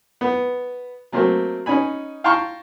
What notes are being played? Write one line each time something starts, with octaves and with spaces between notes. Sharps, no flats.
B3
F#3 A3 A#3 C4
C#4 D#4 G#5 B5
F5 G5 A5 A#5 C6 C#6